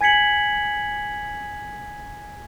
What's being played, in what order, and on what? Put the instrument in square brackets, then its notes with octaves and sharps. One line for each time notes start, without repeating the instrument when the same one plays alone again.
[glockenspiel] G#5 G#6 B6 C#7 F#7